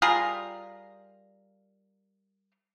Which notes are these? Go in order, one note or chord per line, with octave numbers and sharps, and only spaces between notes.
G3 F4 G#4 A#4